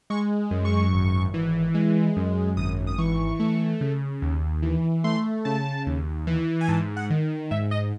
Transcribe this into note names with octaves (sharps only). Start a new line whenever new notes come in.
G#3 C#6
F#2
C#6
G#1
E3
G#3
F#2
G#1 D#6
D#6
E3 C#6
A3
C#3
D#2
E3
A3 C6
C#3 A5
D#2
E3
G#5
G#2 A5
F#5
D#3
G#2 E5
D#5